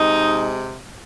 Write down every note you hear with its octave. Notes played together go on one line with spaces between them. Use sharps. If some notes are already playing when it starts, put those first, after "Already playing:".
Already playing: C3 G#3 D#4